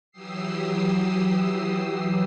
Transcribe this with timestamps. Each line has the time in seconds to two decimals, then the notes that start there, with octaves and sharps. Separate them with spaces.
0.12 E3 F#3 G4 D#6 E6 C7